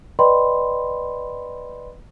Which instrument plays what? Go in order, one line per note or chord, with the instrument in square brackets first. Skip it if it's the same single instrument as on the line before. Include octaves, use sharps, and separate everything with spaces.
[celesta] B4 D5 D#5 G5 B5 C6